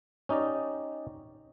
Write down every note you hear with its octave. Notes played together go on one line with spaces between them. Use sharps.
C#4 D#4 G4 D5 D#5